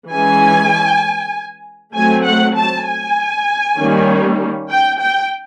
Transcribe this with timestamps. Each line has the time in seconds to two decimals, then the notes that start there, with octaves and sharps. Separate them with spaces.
0.11 E3 G#3 C#4 G#5
1.94 F#3 A3 C4 G#5
2.25 F#5
2.57 A5
2.86 G#5
3.79 D#3 G3 A#3 C#4
4.70 G5
5.01 G5